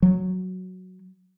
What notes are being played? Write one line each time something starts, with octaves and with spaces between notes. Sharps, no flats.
F#3